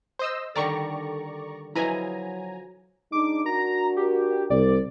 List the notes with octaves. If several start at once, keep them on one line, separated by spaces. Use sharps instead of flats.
C5 D#5 E6
D3 D#3 G3 A4 D5 A#5 C#6
F3 F#3 E4 B4 D#5 G#5 A#5
G#3 D4 D#4 D6
D4 F#4 A#4 A#5
G4
C2 D5